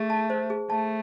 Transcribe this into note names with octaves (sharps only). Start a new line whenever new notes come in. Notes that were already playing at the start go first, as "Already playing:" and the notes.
Already playing: A3 G#4
A5
C5
G#4
A3 A5